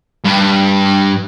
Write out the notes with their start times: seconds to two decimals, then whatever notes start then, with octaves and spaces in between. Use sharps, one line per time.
0.24 G2